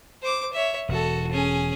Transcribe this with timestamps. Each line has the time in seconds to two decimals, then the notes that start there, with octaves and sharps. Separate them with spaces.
0.22 C5 D6
0.53 C#5 E5
0.89 E1 F#4 A4
1.31 C#4 G#4